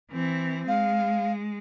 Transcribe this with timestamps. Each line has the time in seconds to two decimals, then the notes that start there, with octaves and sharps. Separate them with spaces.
0.11 E3 C4
0.68 G#3 F5